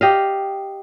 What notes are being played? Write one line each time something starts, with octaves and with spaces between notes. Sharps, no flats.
G4 D#5 F5